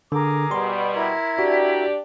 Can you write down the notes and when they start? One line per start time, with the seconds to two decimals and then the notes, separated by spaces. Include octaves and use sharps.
0.12 D3 G#4 A#4 D6
0.51 B2 G3 C6
0.94 E4 A#4 G#6
1.39 D4 F#4 G4 D5